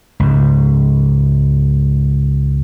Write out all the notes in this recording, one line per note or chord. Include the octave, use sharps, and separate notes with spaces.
C#2 G#2